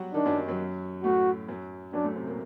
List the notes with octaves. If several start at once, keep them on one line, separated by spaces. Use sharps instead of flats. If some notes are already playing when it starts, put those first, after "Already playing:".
Already playing: F#3 G3 F#4 G4
D#3 D4 D#4
F#2 F#3
D#3
F#2 F#3
A2 A3 F#4
F#2 F#3
F#2 F#3 D4
A2 A3
C3 C4
A#2 A#3